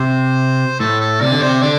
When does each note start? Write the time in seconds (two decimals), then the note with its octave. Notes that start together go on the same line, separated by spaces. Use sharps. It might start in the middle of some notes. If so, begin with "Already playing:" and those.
Already playing: C3 C5
0.80 A2 A4
1.01 A4
1.21 C3 D5
1.31 D3
1.41 C3 C5
1.62 D3 D5